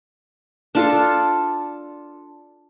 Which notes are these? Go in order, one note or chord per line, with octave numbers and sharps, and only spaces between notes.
D4 F4 A4